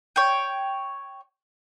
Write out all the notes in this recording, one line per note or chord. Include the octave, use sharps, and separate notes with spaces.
C#5 G5